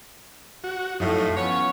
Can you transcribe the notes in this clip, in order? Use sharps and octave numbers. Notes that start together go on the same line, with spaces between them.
F#4
F#2 A2 F3 D#4
F3 B3 C#4 C#5